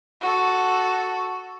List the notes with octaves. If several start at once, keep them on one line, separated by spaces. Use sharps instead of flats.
F#4 A4